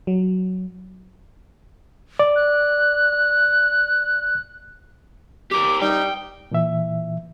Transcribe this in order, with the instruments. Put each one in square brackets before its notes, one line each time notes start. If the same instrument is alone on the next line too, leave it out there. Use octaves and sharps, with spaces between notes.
[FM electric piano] F#3
[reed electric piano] D5
[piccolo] F#6
[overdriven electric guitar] G4 A#4 [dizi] D6
[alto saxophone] G3 [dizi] D#4 [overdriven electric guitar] G5
[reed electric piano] A#2 E3 E5